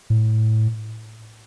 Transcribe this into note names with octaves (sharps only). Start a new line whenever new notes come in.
A2